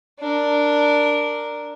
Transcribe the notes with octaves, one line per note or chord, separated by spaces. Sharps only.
D4 A#4